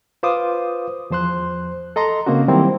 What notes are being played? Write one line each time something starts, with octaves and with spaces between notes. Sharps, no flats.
F4 B4 C5 F5 D6 D#6
E2 F3 C5 C6 F#6
A4 D#5 A#5 C6
C#3 A#3 C4 C#4 F#4
D#3 F#3 G3 A#3 C4 E4